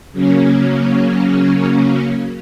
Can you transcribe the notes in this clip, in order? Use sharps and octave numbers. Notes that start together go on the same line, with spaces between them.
C#3 F#3 A#3 C#4